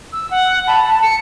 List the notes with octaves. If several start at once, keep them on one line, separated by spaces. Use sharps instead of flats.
E6
F#5
A5 B5
A5
C#7